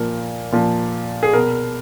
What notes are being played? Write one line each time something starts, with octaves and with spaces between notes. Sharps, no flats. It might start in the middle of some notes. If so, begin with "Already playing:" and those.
Already playing: A#2 F3 A#4
A#2 F3
G#4
B2 A#4